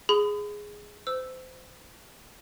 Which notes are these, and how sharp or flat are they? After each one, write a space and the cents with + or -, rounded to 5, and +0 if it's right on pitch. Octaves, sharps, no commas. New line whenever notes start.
G#4 +0 B5 +40
C5 -30 E6 +0